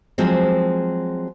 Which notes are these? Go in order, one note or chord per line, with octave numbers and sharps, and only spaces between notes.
F3 F#3 G#3 C4